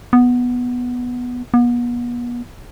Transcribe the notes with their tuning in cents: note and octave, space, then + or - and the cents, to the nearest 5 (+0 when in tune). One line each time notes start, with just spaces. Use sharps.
B3 -5
B3 -40